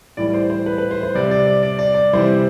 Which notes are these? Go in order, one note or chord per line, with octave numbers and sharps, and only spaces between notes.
A2 E3 G3 D5
C5
C5
B4
B4
C5
C5
C3 G3 D5
D5
D5
D5
D5
D5
C3 E3 G3 C5